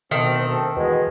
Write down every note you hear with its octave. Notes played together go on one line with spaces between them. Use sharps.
D2 B2 D#3 C4 A4
E2 B2 F3 F#3 G#3